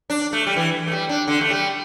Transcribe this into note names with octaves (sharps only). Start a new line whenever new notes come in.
D4
A3
G3
E3
A3
G3
D4
D3
A3
G3